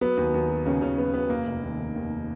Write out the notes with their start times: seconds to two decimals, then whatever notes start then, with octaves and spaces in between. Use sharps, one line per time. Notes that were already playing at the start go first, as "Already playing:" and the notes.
0.01 F#3 B3
0.17 D#2
0.34 D#2
0.49 F#3
0.66 D#2 C#3 C#4
0.81 D#2 C#3 C#4
0.98 F#3 B3
1.14 F#3 B3
1.30 F1 A#3
1.47 F1
1.63 D#2
1.79 F1
1.95 D#2